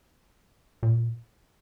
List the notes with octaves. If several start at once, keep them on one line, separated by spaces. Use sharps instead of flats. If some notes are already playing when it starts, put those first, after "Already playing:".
A#2